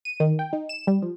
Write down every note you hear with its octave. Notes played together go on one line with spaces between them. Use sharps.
D#7
D#3
G5
D#4
E7
G3
F3